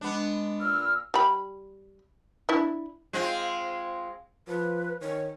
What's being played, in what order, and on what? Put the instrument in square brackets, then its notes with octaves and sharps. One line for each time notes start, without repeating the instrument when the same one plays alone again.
[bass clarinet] G#3 [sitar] B3 D4
[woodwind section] A#2 E6 F6
[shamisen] G3 B5
D4 E4
[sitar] G#3 C4 F4
[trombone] F3 [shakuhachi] B4
[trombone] D#3 [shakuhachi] C#5